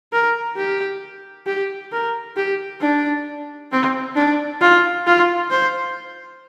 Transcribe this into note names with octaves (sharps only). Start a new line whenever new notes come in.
A#4
G4
G4
A#4
G4
D4
C4
D4
F4
F4
C5